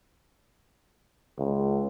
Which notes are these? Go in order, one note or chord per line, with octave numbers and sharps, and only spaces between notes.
C#2